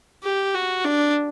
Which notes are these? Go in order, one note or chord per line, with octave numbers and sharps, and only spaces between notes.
G4
F#4
D4